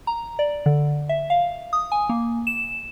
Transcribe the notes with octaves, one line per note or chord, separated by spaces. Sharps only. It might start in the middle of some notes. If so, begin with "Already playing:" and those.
A#5
D5
D3
E5
F5
D#6
G#5
A#3
E7